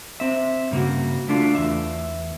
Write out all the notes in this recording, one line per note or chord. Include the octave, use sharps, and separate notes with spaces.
C4 E5
G2 C#3 A#3 F#4
A3 D4 F4
E2 E5